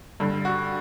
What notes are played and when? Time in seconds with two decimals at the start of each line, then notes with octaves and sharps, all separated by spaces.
0.20 G2 D3
0.45 F#4